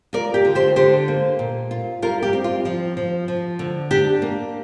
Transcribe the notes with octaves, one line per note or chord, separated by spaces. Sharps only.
F4 A#4 D5
G4
D3
G4 C5
D3 G4 C5
A#3
A#2
F4
G3 F4 A#4
G4
C4
F4
F3
F3
F3
D3
D4 G4
A#3